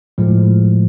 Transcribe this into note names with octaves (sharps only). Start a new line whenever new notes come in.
A2 F3 G#3